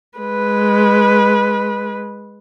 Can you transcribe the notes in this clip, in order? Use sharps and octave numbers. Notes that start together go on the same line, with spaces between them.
G#3 B4